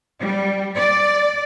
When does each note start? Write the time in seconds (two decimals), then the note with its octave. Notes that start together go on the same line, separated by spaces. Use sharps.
0.21 G3
0.78 D5